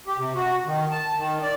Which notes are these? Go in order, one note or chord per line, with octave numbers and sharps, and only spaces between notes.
G4
C3
F#4
D#3
A5
D#3
D5